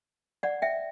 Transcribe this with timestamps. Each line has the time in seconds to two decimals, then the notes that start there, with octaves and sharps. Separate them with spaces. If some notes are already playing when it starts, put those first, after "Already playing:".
0.43 D5 F#5
0.62 E5 G5